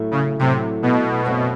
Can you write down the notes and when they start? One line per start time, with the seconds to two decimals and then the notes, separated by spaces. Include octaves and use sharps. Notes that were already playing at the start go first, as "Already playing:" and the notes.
Already playing: A2 F#3 A3
0.11 C#3
0.39 A2 C3 F#3 A3
0.82 B2
1.25 F#2 C#3 F#3 A3 C4